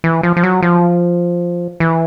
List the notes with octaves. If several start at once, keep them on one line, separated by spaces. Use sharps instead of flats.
E3
F3
F3
F#3
F3
E3